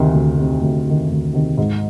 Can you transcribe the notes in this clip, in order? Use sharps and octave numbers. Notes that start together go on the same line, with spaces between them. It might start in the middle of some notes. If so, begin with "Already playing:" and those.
Already playing: D2 C3 D#3
D2
C3 D#3
D2
C3 D#3
D2
C3 D#3
G#2